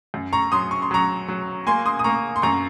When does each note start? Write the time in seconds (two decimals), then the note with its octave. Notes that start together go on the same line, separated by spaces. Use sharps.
0.14 F#2
0.33 A#5 C#6
0.52 F#3 C6 D#6
0.71 C#6
0.82 C6
0.91 F#3 A#5 C#6
1.28 F#3
1.67 A#3 G#5 C6
1.86 C6 D#6
1.99 D#6
2.04 A#3 A#5 C#6
2.36 C6
2.42 F#2 A#5 C#6